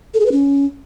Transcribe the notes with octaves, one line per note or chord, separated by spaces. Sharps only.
A4
G#4
B4
C#4